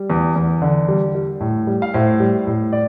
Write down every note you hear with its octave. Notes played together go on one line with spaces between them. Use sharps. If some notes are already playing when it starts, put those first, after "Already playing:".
Already playing: G3
E2
E2
D3
G3
G3
A2
G3
F5
A2 C5 E5
G3
A2
D5